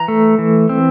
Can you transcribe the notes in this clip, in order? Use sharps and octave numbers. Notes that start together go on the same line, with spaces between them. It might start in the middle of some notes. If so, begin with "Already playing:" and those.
Already playing: E3 A#5
A3
E3
C4